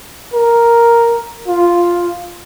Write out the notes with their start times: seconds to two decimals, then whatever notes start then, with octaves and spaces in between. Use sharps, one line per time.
0.34 A#4
1.48 F4